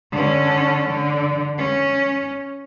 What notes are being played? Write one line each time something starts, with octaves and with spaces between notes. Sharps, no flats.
D3 C#4
D3
C#4